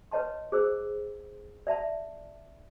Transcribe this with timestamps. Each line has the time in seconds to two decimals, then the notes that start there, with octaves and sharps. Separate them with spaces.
0.11 B4 C#5 D#5 A5 C6
0.52 G#4 C5 E6
1.67 D5 E5 A5 B5